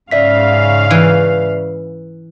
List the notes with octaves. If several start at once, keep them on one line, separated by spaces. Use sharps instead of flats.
G#2 C#3 D5 E5 F5 B6
E3